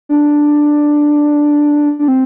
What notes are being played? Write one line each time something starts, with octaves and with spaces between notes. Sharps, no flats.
D4
D4
C4